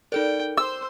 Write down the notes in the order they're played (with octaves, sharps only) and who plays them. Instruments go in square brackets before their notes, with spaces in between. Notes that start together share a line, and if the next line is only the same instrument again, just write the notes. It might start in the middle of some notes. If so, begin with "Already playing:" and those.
[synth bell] D#4 A4 A#4 [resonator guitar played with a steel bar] D5 [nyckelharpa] G5
[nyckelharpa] C5 C6 [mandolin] E6 [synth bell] E7